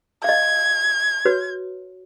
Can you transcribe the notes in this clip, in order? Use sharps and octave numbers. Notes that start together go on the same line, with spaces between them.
D#5 F5 G#6
F#4 B4 C#5